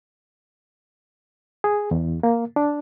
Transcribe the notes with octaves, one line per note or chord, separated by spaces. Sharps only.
G#4
E2
A#3
D4